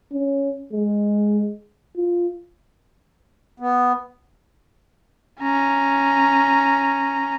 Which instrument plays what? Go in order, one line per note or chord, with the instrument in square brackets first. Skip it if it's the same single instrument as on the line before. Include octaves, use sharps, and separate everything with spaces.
[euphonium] C#4
G#3
F4
[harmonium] B3
[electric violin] C#4 A#5